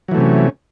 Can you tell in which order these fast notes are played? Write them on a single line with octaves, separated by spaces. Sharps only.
F#3 E3 A3 C3 C#4